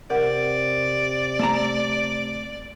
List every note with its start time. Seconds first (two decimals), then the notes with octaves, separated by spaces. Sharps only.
0.10 C3 A#4 D5 F#5
1.39 A3 A5 A#5